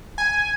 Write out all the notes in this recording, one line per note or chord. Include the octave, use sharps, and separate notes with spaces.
G#5